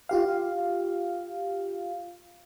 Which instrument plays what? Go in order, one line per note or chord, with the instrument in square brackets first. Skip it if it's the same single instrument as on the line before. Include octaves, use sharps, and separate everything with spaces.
[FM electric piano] F4 G4 F5